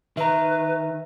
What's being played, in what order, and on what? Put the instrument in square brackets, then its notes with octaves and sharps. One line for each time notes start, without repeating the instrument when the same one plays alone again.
[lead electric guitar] D#3 [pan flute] B4 [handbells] E5 A#5